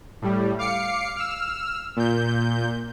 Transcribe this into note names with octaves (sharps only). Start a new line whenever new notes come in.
A2 G3
F5 D6 C7 C#7
E6 F6
A#2 G6